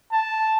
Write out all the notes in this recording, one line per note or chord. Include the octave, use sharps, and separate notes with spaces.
A5